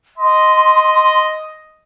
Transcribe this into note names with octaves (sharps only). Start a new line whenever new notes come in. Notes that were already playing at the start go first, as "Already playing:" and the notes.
D#5 C6